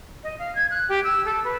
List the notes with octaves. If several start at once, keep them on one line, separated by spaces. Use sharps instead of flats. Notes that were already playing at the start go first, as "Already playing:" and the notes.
D#5
F5
G#6
F#6
G4
E6
A4
B4